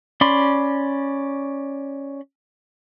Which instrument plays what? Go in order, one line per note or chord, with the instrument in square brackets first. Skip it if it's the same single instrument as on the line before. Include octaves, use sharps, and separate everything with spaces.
[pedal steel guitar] C#4 D5 B5 C6